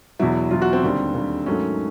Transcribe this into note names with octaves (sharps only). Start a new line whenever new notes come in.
E2 B2 F#3 E4
E2 B2 F#3 F4
F#4
C4
D#2 D3 G3
D#2 D3 G3
G#2 D#3 F#3 A3 C#4